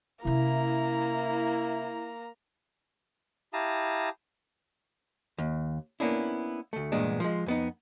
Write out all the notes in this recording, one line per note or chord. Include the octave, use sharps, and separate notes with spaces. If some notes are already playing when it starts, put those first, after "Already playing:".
C3 A#3 C#4 E4 A#5
E4 G4 F5 A5 A#5 D#6
D#2
A#3 B3 C#4 D4 E4
D2 A3
E2 G2 A#2 G#3 B3 D4
F3 G#3
F2 B3 D#4